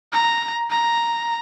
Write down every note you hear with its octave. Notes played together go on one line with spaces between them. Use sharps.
A#5
A#5